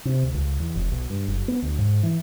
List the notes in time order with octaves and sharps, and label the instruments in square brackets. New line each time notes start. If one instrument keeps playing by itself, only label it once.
[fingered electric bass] C3
D2
C#2
E2
F1
B1
G2
F#1
B3
D2
G#2
E3